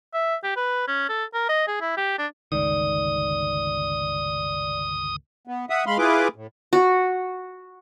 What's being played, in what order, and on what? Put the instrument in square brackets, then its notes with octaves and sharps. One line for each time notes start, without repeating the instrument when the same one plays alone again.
[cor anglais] E5
G4
B4
C#4
A4
A#4
D#5
G#4
E4
G4
D4
[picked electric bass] G1 C#2 D#3 [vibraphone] D5 [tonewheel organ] D#6
[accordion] B3
E5 F#5 D#6
G#3 F5 B5 C6
E4 F4 G#4 B4 D6
A2
[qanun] F#4